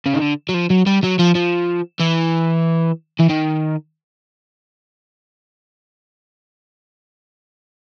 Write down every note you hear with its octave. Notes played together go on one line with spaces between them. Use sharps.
C#3
D#3
D3
F#3
F3
F#3
G3
F#3
F3
F3
E3
E3
D#3